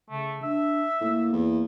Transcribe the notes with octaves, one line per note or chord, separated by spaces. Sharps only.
C#3 A3
D4 E5
A2 A#3
E2